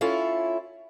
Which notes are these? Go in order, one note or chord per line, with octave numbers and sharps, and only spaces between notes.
C#4 E4 F4 A4 C#5